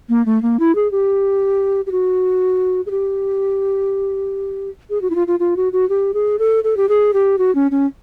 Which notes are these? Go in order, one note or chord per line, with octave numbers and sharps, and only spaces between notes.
A#3
A3
A#3
E4
G#4
G4
G4
F#4
G#4
G4
G#4
F#4
E4
F4
F4
F4
F#4
F#4
G4
G#4
A4
A4
G4
G#4
G4
F#4
C#4
C#4